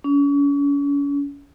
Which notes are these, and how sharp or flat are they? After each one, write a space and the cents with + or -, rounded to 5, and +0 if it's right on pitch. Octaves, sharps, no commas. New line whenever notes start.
C#4 +40